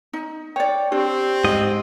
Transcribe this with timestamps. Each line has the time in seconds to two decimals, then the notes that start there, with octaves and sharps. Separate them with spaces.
0.13 D#4
0.56 C#5 D5 G5
0.92 C4 D4 G4
1.44 G#2 D#5